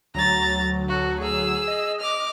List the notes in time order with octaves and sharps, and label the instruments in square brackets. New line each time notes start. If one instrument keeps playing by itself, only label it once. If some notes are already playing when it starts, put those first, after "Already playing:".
[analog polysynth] D2 F#3 [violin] A#5 A6
[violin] F#4 A4
G#4 E6
[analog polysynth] D#5
[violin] D6 F6